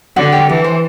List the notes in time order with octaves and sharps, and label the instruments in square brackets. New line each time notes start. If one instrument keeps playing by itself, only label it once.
[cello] D3 [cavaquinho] F#4
[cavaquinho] G4
[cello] E3 [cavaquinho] A4
[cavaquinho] C5